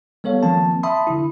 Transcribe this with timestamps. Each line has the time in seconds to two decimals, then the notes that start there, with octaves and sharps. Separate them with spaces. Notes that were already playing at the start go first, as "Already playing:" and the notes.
0.24 G3 B3 A4 C#5 F5
0.43 D#3 F3 A#3 C4 A5
0.83 E5 A5 B5 C6 D#6
1.07 D3 E4